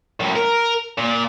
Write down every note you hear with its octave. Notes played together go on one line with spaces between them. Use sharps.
F#2 A2
A#4
A#2